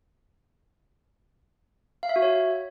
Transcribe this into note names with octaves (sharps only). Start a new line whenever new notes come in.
F5
E5
F#4
C#5